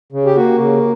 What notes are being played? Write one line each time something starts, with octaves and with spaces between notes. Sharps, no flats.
C#3
G4
A#3 F#4
C#3